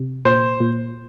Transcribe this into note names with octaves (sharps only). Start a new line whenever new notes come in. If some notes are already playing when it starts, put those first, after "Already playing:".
Already playing: C3
A#2 C5
A#2